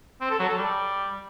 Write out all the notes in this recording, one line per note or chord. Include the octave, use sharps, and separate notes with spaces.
C4
A4
F#3
A4
G3